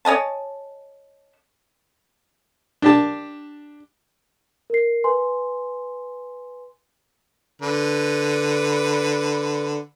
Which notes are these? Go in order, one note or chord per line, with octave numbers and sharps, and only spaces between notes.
C#5 D#5 G#5 A5
D4 G4 A5
A#4 C7
B4 G#5 C6
D3 B4